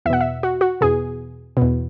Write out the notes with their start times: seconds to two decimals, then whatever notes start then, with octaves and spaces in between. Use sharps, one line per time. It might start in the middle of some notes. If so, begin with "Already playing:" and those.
0.06 E2 E5
0.10 B2 F#5
0.21 E5
0.43 F#4
0.61 F#4
0.81 E2 B2 G#4
1.57 B2
1.62 E2